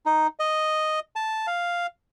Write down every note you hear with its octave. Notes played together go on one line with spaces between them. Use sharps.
D#4
D#5
A5
F5